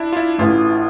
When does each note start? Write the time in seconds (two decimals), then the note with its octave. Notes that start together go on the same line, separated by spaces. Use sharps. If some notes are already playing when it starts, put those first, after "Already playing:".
Already playing: D4 E4
0.12 F4
0.17 E4
0.38 A1 A2 E3 F4